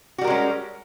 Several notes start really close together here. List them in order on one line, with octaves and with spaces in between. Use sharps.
F#4 G3 A#4 G#3 C#4